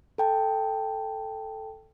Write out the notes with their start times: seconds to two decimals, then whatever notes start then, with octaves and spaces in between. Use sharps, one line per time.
0.18 A4 G5 A5